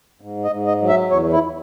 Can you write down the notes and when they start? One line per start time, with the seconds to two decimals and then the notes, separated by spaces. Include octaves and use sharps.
0.21 G#2
0.45 D#5
0.51 G#2
0.67 D#5
0.82 F#3
0.89 E5
1.10 E2 C#5
1.33 E4